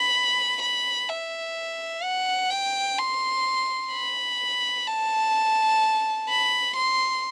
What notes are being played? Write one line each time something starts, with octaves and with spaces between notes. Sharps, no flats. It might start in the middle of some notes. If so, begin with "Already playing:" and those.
Already playing: B5
B5
E5
F#5
G5
C6
B5
A5
B5
C6